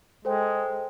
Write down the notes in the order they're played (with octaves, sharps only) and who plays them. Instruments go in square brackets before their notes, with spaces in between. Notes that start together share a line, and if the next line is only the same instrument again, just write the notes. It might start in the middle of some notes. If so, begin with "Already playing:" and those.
[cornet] G#3 [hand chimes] A4 C5 G5